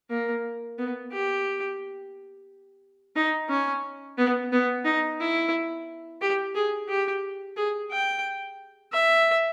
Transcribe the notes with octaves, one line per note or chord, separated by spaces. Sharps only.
A#3
B3
G4
D#4
C#4
B3
B3
D#4
E4
G4
G#4
G4
G#4
G5
E5